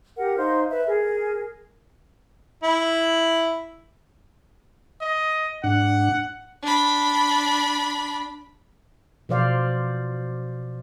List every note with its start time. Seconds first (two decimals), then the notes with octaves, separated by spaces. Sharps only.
0.16 G4 A#4 F#5
0.37 D#4 C5 F5
0.70 B4 E5
0.86 G#4 A#4
2.63 E4
5.01 D#5
5.64 G#2 D4 F#5
6.63 D4 B5
9.29 B2 F3 C5 D5 F5